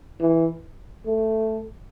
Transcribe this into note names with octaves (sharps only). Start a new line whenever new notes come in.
E3
A3